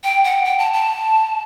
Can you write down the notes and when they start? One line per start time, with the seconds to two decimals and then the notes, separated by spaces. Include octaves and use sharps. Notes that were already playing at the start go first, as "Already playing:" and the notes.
0.04 G5
0.24 F#5
0.45 G5
0.59 A5
0.73 A5